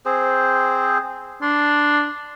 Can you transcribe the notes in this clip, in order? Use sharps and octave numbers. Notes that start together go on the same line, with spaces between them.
C4 G#4 C5
D4 C6